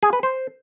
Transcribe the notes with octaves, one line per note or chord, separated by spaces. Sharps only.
G#4
B4
C5